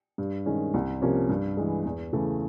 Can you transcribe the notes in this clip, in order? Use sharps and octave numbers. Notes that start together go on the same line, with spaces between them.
G2
D#3 G#3 C#4
C2
C3 F3 A#3 C#4
G2
E3 G#3
E2
C#3 E3 A3